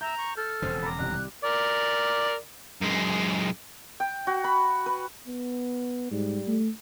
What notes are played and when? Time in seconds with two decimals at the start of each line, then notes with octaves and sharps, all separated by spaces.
0.01 E5 A#5 G6
0.18 C#6
0.37 A4 F6
0.62 E1 F2 C#3 C5
0.83 A#5 B5 D6
0.99 C2 D#3 G3 F#6
1.44 A#4 D5
2.82 F#2 G#3
4.00 G5
4.27 F#4
4.44 B5
4.86 B4
5.28 B3
6.11 G#2 G3
6.48 A3